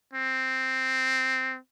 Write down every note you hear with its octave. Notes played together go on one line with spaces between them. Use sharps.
C4